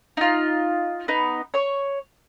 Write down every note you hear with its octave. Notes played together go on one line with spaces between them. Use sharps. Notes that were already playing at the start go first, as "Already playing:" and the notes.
D#4 F4
B3 D#4
C#5 C#6